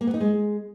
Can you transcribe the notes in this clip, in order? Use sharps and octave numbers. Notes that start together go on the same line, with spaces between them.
A#3
B3
D#4
G#3